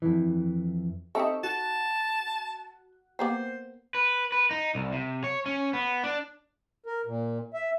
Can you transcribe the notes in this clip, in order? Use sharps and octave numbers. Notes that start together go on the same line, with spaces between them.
F2 E3
C4 D#4 G4 A4 E5 G5 C#6
F#4 A5
A#3 B3 G4 C5
B4
B4
D#4
C2
C3
C#5
C#4
B3
D4
A#4
A#2
E5